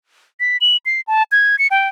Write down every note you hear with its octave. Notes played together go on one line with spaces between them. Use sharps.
B6
F#7
C7
A5
G#6
C#7
G5